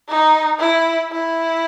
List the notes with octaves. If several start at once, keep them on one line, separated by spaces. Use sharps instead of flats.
D#4
E4
E4